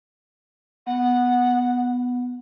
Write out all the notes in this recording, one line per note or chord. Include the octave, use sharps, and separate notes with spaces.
B3 F#5